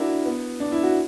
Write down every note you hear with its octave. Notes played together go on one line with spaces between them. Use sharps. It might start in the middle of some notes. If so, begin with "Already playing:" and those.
Already playing: D4 E4 F#4 A#4
B3
D4
E4
F#4